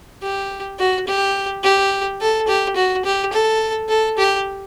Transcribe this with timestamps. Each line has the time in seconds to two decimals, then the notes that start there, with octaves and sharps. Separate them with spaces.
0.22 G4
0.79 F#4
1.08 G4
1.64 G4
2.21 A4
2.48 G4
2.76 F#4
3.05 G4
3.33 A4
3.89 A4
4.18 G4